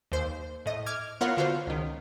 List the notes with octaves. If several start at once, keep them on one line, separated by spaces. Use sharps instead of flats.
D#2 C5
A2 D#5
D6 F6 G#6
B3 F4 A#4 C#5 F5 F#5
D3 F4 F#4 C5
C#2 D#3